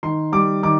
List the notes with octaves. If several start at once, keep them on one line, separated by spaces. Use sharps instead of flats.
D#3 C6
G3 D6
D#3 D6